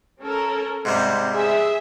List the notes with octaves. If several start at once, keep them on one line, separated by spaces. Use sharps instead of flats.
C#4 A4 A#4
G#2 C3 G3 C4
G#4 E5